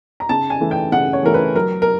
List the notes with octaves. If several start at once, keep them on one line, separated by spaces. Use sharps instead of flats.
A#5
C#3 A5
G#5
E3 A3
G5
C#3 F#5
C#5
E3 A3 A#4
B4
F#3 A#4
A#4